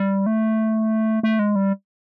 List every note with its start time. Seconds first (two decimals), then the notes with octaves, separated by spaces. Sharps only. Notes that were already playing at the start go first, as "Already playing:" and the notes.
Already playing: G3
0.26 A3
1.23 A3
1.39 G#3
1.56 G3